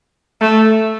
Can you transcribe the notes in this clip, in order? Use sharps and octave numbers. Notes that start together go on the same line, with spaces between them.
A3